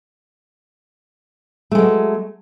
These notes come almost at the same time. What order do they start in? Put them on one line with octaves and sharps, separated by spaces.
A3 G#3 F#3